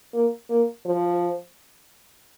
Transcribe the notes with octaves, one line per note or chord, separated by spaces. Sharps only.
A#3
A#3
F3